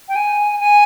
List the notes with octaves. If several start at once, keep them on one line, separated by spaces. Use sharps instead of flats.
G5
G#5
G#5